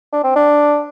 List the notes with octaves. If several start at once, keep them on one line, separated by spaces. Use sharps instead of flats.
D4
C4
D4